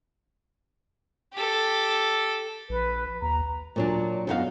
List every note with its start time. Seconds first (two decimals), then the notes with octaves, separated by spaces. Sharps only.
1.34 G4 A4
2.69 A#1 B4
3.22 D#2 A#5
3.76 A#2 F#3 D4
4.27 F#2 A3 B3 D#4 F#4 F5